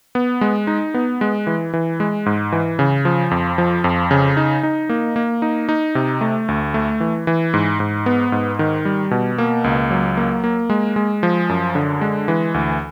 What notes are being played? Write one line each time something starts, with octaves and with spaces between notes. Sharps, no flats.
B3
G#3
D#4
B3
G#3
E3
E3
G#3
G#2
E3
C#3
F3
F2
F3
F2
C#3
D#4
D#4
A#3
A#3
D#4
D#4
C3
A3
D2
A3
E3
E3
G#2
G#2
B3
G#2
D#3
G3
B2
A#3
C#2
F#3
A#3
A#3
G#3
G#3
F3
F#2
D3
G#3
E3
D2